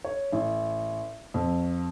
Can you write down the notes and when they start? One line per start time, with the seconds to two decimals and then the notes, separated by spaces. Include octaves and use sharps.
0.04 C#5
0.32 A1
1.34 F2